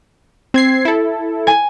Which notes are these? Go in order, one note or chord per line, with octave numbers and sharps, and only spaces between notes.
C4 G#6 C7
E4 A4
G#5